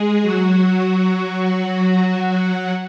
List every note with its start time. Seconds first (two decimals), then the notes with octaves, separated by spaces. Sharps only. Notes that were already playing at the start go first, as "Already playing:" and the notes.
Already playing: G#3 G#4
0.23 F#3 F#4